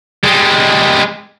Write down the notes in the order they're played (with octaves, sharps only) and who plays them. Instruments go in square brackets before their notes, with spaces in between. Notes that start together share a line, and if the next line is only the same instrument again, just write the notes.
[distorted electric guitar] G3 G#3